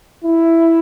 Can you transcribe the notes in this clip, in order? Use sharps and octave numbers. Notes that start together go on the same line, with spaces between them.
E4